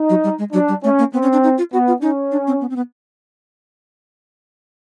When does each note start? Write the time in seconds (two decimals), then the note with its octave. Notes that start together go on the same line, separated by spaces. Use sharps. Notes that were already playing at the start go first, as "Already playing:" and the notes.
Already playing: D#4
0.10 F#3
0.24 G3
0.38 G#3
0.53 F#3 D4
0.68 G3
0.83 A3 C#4
0.99 A#3
1.13 B3 C4
1.22 C#4
1.33 D4
1.43 D#4
1.58 F4
1.72 B3 F#4
1.87 F4
2.02 C#4 D#4
2.32 D4
2.47 C4
2.61 B3
2.70 C4
2.76 B3